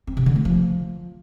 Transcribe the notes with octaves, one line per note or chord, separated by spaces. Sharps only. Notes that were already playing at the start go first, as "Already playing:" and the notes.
C4
C3
D3
A3
F3